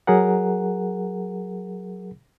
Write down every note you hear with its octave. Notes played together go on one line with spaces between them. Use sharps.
F#3 G#4 A#4 F#5